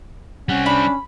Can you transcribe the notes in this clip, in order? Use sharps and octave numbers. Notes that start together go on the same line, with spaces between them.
G3 C4 C#4 F#5
D4 B5